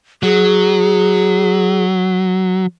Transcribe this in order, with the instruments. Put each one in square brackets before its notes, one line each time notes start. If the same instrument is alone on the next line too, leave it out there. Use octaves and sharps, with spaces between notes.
[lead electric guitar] F#3 [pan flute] G#4